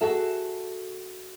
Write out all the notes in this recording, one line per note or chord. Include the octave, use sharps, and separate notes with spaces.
F#4 G#4 A4 E5